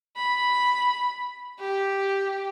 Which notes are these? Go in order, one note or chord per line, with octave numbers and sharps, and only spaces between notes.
B5
G4